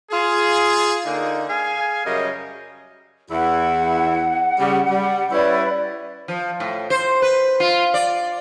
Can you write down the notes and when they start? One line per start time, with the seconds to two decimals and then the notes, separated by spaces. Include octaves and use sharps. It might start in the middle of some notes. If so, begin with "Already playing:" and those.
0.11 F4 G#4
1.04 D3 A#3 D#4
1.49 G#4 F5 G#5
2.04 F#2 C#3 G3 A#4 D#5
3.31 E2 E4 F#5
4.59 C#3 G3
4.90 G3
5.31 G3 C#4 E4 B4 D5
6.28 F3
6.60 A2
6.90 C5
7.22 B4
7.60 F4
7.94 D5